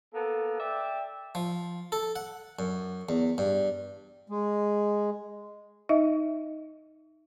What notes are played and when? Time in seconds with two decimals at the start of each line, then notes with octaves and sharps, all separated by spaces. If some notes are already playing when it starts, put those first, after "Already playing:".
0.13 A#3 B3 A4
0.59 D5 E5 G5
1.35 F3
1.92 A4
2.16 F#5
2.59 F#2
3.09 E2
3.38 G2
4.29 G#3
5.89 D#4 D#5 E5